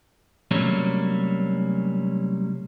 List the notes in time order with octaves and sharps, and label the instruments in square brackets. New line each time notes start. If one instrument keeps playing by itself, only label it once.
[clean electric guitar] C3 F#3 G3 A3 A#3 C#4